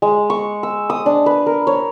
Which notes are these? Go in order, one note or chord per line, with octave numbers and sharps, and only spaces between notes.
G#3
C#6
E6
D#6
D4
B4
A#4
C#5